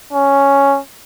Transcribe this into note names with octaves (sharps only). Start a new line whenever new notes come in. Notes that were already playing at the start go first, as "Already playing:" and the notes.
C#4